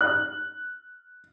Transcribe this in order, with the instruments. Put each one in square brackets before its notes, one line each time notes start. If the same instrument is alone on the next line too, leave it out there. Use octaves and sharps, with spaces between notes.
[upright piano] F#6